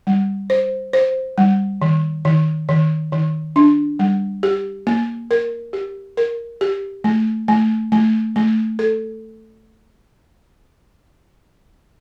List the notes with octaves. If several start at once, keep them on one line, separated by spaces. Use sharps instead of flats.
G3
C5
C5
G3
D#3
D#3
D#3
D#3
D4
G3
G4
A#3
A#4
G4
A#4
G4
A3
A3
A3
A3
A4